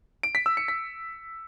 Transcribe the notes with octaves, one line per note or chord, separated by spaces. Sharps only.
D7
B6
E6
C#7
B6